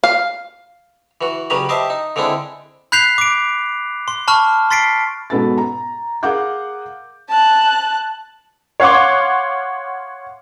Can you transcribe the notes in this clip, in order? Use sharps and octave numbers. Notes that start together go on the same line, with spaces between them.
F5
E3 F#4
C#3 F#3 G3 B4 A#5
G4 C5 D#5 E5 A5
D#4
D3 G#3 C4 D4 E4
B5 F#6 G6 B6 C7 F7
D6 D7
C6
A5 B5 C#6 F6
C6 A6 B6 C7 D7
G#2 B2 B3 A4 B5 A6
A#5
G#4 A#4 F5 F#5 D6 G6
A5 F#6
C#5 F5 F#5 C6 D6